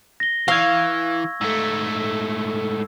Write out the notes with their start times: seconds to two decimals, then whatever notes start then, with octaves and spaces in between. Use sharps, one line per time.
0.20 A#6 G7
0.48 E3 F5 C#6 E6 G#6
1.41 G#2 A3 E6